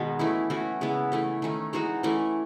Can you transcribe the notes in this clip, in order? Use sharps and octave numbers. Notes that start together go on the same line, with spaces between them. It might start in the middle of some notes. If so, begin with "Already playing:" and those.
Already playing: B2 D#3 G#3 B3 D#4
E3 A3 C#4 E4
E3 A3 C#4 F#4
C#3 G#3 B3 E4
E3 A3 C#4
D#3 A3 C#4
E3 G#3 D#4 F#4
E3 A3 C#4